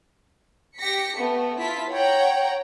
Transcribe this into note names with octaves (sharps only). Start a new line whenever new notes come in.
G4 A#6 B6 C#7
A3 B3
E4 F4 A5 B6
C#5 F#5 G5 A#5